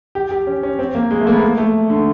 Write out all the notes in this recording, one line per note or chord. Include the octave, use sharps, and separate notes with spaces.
G4
G4
C#4
C#4
C4
A#3
G#3
A3
A#3
B3
A#3
A3
D3